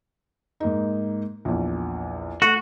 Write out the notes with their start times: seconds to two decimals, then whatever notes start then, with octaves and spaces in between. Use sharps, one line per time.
0.60 G#2 A#3 D#4
1.45 A#1 E2
2.42 A3 F#4